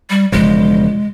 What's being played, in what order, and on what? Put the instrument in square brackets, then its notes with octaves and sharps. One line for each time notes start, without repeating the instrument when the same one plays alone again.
[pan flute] G3
[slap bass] E1 C#3 F3 [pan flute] G#3